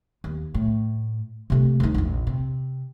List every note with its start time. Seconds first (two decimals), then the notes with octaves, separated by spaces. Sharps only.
0.24 D#2
0.54 A2
1.50 C3 A3
1.80 D2 D#4
1.94 A#1 E2
2.27 C3